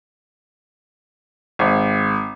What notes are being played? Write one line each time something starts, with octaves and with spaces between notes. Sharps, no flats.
G#1